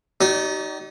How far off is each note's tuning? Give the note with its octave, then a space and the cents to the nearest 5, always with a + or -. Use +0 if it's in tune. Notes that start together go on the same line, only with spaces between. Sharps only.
D#4 +0 G4 -45 D5 -30